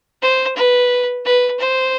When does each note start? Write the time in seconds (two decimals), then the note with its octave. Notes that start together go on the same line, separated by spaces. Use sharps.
0.22 C5
0.56 B4
1.25 B4
1.59 C5